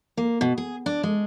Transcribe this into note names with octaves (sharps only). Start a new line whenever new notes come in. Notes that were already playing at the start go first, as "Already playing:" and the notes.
A#3
B2
G#4
D4
G#3